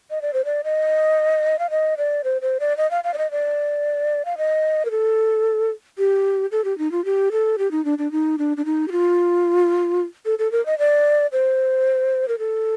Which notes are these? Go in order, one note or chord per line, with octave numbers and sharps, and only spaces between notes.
D#5
D5
C5
D5
D#5
F5
D#5
D5
C5
C5
D5
D#5
F5
F5
D5
D#5
D5
F5
D#5
A#4
A4
G4
A4
G4
D#4
F4
G4
A4
G4
D#4
D4
D4
D#4
D4
D4
D#4
G4
F4
A4
A4
A#4
D#5
D5
C5
A#4
A4